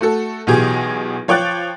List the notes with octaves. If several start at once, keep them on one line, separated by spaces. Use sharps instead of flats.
A3 F#4 A4
B1 B2 E3 G4 G#4 G#6
F3 C#5 G5 D6 F#6 A6